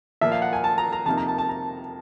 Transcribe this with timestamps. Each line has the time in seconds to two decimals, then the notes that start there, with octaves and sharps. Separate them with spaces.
0.21 A#2 F3 A#3 E5
0.32 F5
0.42 F#5
0.53 G#5
0.64 A5
0.78 A#5
0.93 A#5
1.06 F2 C3 F3 A#3 D#4 A5
1.17 A#5
1.28 A5
1.38 A5
1.49 A#5